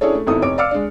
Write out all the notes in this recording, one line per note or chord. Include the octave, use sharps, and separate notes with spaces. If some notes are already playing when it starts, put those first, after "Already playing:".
C#4 D4 E4 G#4 A4 C#5
A3
G#1 B3 D#4 E4 A4 D#6
F1 C#5 D6 D7
D5 F5 D6 E6 F6 C#7
G#3 D4